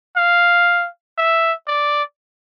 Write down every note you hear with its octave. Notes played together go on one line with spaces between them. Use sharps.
F5
E5
D5